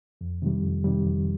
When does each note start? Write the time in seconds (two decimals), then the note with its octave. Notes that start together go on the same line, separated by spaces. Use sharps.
0.21 F2
0.42 C3 D#3 G3
0.63 F2
0.84 C3 D#3 G3
1.05 F2